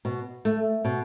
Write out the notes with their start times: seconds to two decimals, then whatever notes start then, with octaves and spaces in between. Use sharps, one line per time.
0.05 B2
0.45 A3
0.85 B2